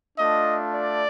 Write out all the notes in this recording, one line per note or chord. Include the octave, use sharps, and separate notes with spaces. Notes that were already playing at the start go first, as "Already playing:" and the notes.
A3 D4 F4 D#5
D5